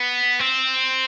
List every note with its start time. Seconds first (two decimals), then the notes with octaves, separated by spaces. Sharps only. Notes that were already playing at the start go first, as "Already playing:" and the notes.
Already playing: B3
0.39 C4